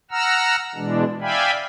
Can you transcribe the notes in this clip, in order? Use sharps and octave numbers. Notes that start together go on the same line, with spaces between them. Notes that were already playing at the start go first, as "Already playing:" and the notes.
F#5 A#5 E6 F6
B2 E3 G#3 D4
D5 E5 F5 G5 G#5 B5